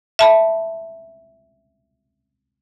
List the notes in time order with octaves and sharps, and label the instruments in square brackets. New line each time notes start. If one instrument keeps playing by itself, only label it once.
[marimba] E5 A5 B5